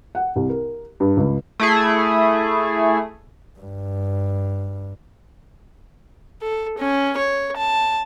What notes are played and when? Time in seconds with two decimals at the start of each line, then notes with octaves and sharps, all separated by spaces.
0.15 F#5
0.36 C2
0.49 A#4
1.00 G2
1.17 C#2
1.60 A3 E4 G#4
3.59 G2
6.42 A4
6.78 C#4
7.17 C#5
7.57 A5